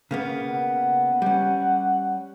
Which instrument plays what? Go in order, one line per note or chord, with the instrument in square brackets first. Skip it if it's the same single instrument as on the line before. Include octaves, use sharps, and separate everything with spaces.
[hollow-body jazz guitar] C#3 A#3 B3
[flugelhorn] F#5
[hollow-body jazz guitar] G3 C#4